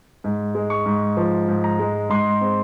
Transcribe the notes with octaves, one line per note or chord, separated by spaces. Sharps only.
G#2
G#3
C#6
G#2
F3
G#2
A#5
G#3
G#2 C6
C4